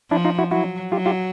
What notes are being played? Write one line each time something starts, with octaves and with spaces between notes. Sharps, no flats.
F3 D4 E4
D#4 F4
E4 F#4
F#3 E4 F#4
F#3 F4 G4
F4 G4